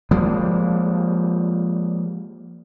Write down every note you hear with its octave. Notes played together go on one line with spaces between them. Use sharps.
F3 G3 G#3 A#3